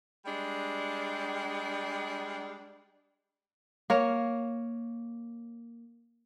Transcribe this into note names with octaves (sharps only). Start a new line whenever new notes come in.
G3 G#3 D4
A#3 C#5